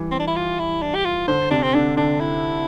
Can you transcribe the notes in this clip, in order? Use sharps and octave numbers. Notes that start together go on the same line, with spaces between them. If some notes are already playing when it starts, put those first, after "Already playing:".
Already playing: E3 G3
C4
D4
E4
F4
E4
D4
G4
F4
D3 C5
C3 D4
C4
D3 D4
D3 D4
E4